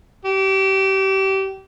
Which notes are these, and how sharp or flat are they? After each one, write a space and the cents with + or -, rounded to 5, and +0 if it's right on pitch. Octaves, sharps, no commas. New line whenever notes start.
G4 -30